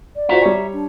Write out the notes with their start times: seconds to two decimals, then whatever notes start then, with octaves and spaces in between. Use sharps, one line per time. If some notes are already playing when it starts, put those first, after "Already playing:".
0.16 D5
0.29 F4 F#4 C5 E5 A#5
0.42 G3 C#5
0.73 D4